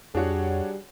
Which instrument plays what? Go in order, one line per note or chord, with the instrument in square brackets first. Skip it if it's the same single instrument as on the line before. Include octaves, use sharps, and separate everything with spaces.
[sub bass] F2 [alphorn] G3 [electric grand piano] D4 C#5 F#5 [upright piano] F#4 G#4